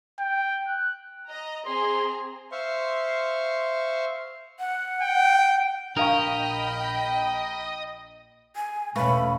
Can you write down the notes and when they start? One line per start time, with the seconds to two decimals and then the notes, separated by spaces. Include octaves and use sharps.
0.20 G5
0.68 F#6
1.28 D#5 A#5
1.66 C4 G#4 A#5 C6
2.52 C5 E5 F5 C6 C#6
4.59 F#5
5.02 G5
5.97 A#1 D4 A#4 D#5 F5 G5 B5 C#6
8.56 G#5
8.96 E2 B2 A3 C#4 B4 F5 B5 C#6